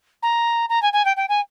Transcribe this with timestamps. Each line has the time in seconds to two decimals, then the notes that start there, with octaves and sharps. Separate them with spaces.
0.23 A#5
0.69 A#5
0.82 G#5
0.93 G#5
1.05 G5
1.17 G5
1.29 G#5